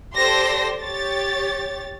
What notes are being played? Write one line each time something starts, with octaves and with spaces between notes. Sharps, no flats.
G4 A4 C5 D5 C6 A#6
G4 C#5 A6